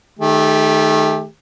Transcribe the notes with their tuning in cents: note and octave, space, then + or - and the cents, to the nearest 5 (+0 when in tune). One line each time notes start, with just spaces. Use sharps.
D#3 +0 A3 -25 G4 +15